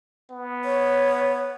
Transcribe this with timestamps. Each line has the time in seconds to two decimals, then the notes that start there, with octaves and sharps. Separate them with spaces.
0.31 B3
0.64 C#5